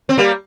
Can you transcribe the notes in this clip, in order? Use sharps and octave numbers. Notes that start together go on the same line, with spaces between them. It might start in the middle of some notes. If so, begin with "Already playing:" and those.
C4
G3 A#3